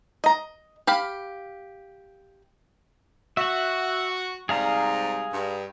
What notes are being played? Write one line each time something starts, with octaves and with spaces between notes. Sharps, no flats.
D#5 A#5
G4 F5 B5
F#4 E5 F#5
G#2 C3 G3 G#4 F5 A#5
G2